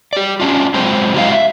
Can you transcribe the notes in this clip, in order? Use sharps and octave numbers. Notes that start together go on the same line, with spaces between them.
G4 D5
C#4 D4 F4
F#3 G#3 C4 F4 C5
F#3 G#3 E4 G4 D#5 F5
E5